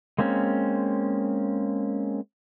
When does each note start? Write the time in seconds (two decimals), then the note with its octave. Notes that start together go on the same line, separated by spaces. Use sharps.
0.18 G#3 A#3 C4 C#4